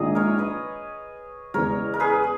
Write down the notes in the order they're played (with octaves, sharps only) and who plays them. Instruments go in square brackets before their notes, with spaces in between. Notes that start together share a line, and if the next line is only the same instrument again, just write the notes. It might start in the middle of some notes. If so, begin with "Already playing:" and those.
Already playing: [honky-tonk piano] A#1 G#2 D#3 [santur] G#4 D#5
[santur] A#4 C#5
B4 D#5
[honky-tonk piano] E2 C#3 G#3 [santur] A#4 C#5
[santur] A#4
G#4 B4